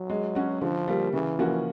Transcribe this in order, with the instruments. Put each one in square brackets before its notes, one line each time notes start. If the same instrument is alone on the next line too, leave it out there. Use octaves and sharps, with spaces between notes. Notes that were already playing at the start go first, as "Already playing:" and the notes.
Already playing: [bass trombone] F#3
[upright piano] G#3
C#4 F#4
[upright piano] D3 [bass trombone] F3
[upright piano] G3 A#3
[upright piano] C#3 [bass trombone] E3
[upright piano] F3 A#3 C#4 F#4